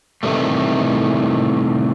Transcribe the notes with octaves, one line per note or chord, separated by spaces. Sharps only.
A2 C3 D#3 E3 G3 A3